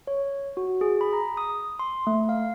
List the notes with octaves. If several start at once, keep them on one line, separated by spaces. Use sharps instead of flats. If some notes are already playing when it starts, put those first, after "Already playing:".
C#5
F#4
G#4
B5
A#5
D#6
C6
A3
F5